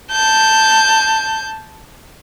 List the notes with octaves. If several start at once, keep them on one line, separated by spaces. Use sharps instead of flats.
A5 G6